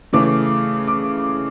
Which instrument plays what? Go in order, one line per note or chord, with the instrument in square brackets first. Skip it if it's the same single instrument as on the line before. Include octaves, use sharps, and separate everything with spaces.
[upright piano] C#3 E3 A3 C#4 D6
D6